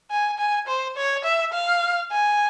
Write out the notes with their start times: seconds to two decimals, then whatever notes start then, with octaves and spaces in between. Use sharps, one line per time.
0.11 G#5
0.38 G#5
0.67 C5
0.97 C#5
1.25 E5
1.53 F5
2.12 G#5